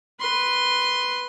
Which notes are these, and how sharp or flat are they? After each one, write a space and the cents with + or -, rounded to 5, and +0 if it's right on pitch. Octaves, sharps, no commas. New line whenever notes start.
B4 +0 C6 +0